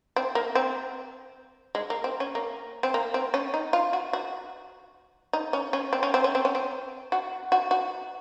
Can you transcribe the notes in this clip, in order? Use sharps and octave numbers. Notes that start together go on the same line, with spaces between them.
C4
A#3
C4
G#3
A#3
C4
C#4
A#3
C4
A#3
C4
C#4
D#4
F4
F#4
F#4
D#4
C#4
C#4
C4
C#4
C4
C#4
C4
C#4
C4
F#4
F#4
F#4